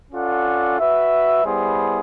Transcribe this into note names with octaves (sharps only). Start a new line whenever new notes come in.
C#4 F4 A4 D5 F#5
F#4 B4 E5
G3 B3 E4 G#4 C5